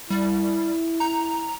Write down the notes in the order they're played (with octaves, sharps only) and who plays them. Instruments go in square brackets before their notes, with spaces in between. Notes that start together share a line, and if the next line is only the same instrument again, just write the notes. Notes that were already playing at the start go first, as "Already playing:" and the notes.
[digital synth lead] G3 [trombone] E4
[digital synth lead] A#5